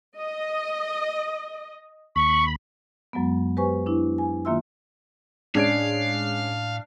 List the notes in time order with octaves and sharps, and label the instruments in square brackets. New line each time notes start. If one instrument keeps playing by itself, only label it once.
[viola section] D#5
[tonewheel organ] D#2 B5 [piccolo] C#6
[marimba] F#2 F#3 G#3 B3
G4 B4 C5 G#5 C#6
D4 E4
G#5
D#3 A#3 F4 E5 C6 E6
[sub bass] A2 [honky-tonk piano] G#3 C#4 [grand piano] D4 G#6 D7 [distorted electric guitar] F5